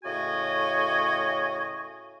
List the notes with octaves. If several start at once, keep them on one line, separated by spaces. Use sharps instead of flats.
A2 C#3 F#4 D#5 G#5 C#6